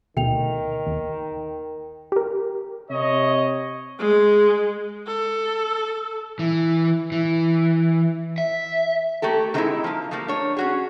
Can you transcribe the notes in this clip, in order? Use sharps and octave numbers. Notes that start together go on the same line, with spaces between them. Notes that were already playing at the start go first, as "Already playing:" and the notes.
D2 B2 D#3 A3 G5 F7
D#2
G4 A#4
C3 C#5 D#5
G#3
A4
E3
E3
E5
A3 A#3 G4 A4
D#3 F#3 G#3 C4 D#4 E4
F3 A#3
F3 G3 A3 A#3
D4 C#5
C#4 F#4 G#4